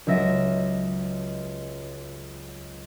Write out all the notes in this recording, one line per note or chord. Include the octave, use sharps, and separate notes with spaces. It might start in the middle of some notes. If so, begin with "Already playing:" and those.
C#2 F#3 E5 A#6 D#7